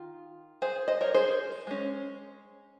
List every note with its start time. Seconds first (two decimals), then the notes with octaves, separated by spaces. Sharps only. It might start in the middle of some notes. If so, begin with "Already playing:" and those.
Already playing: D#3 F4
0.62 G#4 C5
0.88 C5 D#5
1.01 A#4 C#5
1.14 G#4 C5
1.67 G#3 C#4